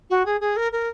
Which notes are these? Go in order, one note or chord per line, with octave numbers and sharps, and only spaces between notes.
F#4
G#4
G#4
A#4
A#4